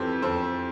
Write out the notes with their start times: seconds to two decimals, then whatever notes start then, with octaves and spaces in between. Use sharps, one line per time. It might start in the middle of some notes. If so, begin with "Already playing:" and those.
Already playing: F2 E3 G4 A4 C5
0.22 F2 A4 C5